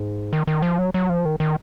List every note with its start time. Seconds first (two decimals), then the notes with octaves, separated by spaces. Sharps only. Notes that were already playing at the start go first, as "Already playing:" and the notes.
Already playing: G#2
0.33 D#3
0.47 D#3
0.62 F3
0.79 F#3
0.94 F#3
1.09 F3
1.25 D#3
1.40 D#3